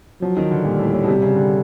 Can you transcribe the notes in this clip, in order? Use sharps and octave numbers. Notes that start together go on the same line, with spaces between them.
F3 F#3
D#3
D3
A#2 G3
A2
A2
B2
C3
C#3
D3